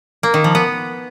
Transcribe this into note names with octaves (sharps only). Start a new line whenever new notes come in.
A#3
D#3
F3
B3